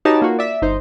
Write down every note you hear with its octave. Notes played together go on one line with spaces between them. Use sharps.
D#4 F#4 G4 B4 C#5 A5
A#3 F4 F#4
D5 E5
G1 D#4 C5